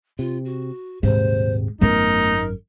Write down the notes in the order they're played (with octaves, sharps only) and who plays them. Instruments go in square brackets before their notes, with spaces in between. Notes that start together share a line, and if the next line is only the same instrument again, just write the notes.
[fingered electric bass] C3 [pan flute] F4
[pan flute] F#4
[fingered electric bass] D#1 G#1 C3 [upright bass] G#2 [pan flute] C5
[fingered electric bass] G#1 F#2 [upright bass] A3 B3 [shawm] D#4 [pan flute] A#4